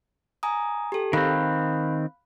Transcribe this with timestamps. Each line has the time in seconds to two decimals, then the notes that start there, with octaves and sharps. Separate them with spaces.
0.43 G#5 A#5 D#6
0.92 G4 A4
1.13 D#3 C4 F5 B5 F#6